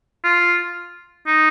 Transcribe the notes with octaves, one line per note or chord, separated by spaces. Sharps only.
F4
D#4